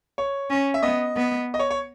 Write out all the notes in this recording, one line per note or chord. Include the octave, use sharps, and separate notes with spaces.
C#5
C#4
E5
B3 D#5
B3
D#5
C#5
C#5